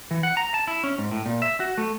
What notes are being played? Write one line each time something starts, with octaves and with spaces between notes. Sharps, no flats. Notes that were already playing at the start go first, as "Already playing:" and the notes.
E3
F#5
A#5
A5
E4
C#4
G#2
A2
A#2
E5
F#4
A3